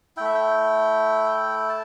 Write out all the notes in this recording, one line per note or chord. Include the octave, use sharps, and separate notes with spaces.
A3 E4 G5
E5
G5
A5